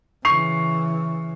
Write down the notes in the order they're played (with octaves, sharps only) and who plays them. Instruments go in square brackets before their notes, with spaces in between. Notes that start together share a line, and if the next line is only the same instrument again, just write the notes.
[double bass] C#3 E3 [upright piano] C#6 C7 F7